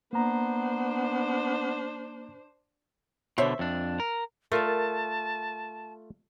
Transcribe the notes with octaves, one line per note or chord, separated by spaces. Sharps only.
A#3 B3 D4 C5 A#5
B2 D3 C5 C#5 E5
F2 D4
A#4
A3 F4 A#4 D5 A5